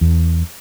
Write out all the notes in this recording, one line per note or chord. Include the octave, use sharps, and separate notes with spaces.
E2